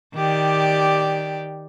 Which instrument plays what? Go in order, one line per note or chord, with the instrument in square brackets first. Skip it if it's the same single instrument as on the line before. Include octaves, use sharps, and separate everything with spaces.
[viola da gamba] D#3 G4 D5